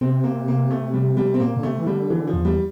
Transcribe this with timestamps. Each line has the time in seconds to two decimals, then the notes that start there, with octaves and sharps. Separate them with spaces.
0.01 C3 C4
0.24 A#3
0.48 A#3
0.71 A3
0.94 G3
1.17 G3
1.34 C4
1.40 A#2 A#3
1.56 D3
1.63 C3 A3
1.79 E3
1.86 D3 G3
2.10 D3 E3
2.27 F3
2.33 E2
2.45 G3